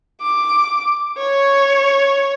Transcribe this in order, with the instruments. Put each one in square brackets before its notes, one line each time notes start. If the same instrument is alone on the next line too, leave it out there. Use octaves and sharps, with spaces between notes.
[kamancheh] D6
C#5